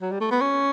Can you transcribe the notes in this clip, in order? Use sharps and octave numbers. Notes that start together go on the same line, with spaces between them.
F#3
G3
A3
B3
C#4